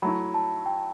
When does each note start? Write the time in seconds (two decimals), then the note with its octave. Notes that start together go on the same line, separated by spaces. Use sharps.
0.02 F#3 A3 E4 B5
0.34 A5
0.66 G5